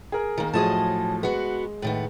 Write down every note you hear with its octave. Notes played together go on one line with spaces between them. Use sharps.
G#4 A#4
D#3 A#3
A2 F3 F#3 G#4 D#5 A5
G#3 B3 F#4
A2 D#3 B3